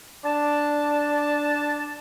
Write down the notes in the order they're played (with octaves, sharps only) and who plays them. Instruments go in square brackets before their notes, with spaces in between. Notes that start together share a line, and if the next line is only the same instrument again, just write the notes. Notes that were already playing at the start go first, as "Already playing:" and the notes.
[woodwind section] D4 A5